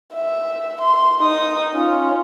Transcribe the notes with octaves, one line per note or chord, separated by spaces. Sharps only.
E5
C6
D#4 D#6
C#4 F4